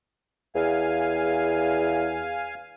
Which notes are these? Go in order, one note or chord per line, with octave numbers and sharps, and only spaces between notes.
E2 F5 G#5